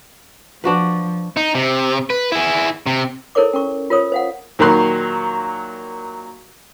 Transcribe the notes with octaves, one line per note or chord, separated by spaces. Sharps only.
F3 D4 F#4 B4
D#4
C3
B4
E4 G#4
C3
E4 A4 A#4 C5 C#5 D6
C#4 A#4 C#6
F4 A#4 C5 C#5 D#6
C5 F5 F#5
A#2 D#3 F#3 B5 C6 F#6